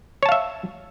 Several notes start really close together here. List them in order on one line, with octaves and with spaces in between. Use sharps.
C#5 A5 F5 E5